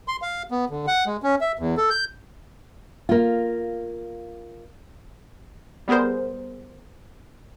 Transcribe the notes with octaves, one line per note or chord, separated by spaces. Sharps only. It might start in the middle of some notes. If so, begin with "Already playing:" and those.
C6
F5
B3
D3
F#5
G#3
C#4
E5
E2
A4
G6
A#3 F4
G3 B3 G#4 A#4 C5